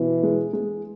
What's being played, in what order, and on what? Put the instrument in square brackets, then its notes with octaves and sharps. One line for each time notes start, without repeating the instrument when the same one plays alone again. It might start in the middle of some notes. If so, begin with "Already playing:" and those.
Already playing: [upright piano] B2 [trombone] E3
[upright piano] G#3
G#3